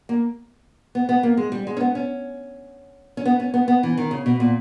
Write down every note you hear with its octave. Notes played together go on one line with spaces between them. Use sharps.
A#3
B3
B3
A#3
G#3
G3
G#3
C#4
B3
C#4
C#4
B3
C#4
B3
B3
E3
D#3
C#3
B2
A#2